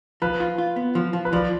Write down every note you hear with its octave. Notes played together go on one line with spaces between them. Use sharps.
F3 B4
F4
F4
B3
F3
F3
B4
F3 D5